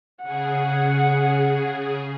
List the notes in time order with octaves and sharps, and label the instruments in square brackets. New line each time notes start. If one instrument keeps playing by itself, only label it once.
[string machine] C#3 G#4 [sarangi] F#5